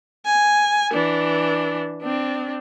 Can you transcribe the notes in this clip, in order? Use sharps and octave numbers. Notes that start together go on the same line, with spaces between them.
G#5
E3 D4
C4 D4